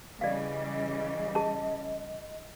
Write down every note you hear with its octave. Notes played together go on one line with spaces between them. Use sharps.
C#3 E3 G3 D5 D#5 F5
G#4 A5